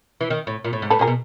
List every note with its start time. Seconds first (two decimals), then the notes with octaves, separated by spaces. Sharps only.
0.21 E3
0.30 D#3
0.47 A2
0.64 A#2
0.73 A2
0.82 G#2
0.90 A2 A4 B4
0.99 A#2 G#4 A#4
1.07 B2